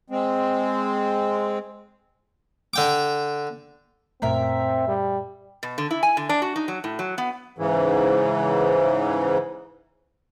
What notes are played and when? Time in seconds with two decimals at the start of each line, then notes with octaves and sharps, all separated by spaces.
0.10 G#3 C4
2.74 D3 G5 D6
4.22 F#2 A#2 A3 C4 A#4 E5
4.88 G3
5.63 B2
5.78 D3
5.91 E4
6.03 G#5
6.17 D3
6.29 D4
6.42 F#4
6.56 D#4
6.68 F#3
6.84 A2
6.99 F#3
7.18 B3
7.58 G#2 C#3 E3